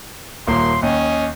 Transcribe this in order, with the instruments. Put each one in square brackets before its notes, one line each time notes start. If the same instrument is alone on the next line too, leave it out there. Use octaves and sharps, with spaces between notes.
[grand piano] D#1 A#3 [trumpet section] C6
[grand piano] D#2 [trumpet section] C#4 D#5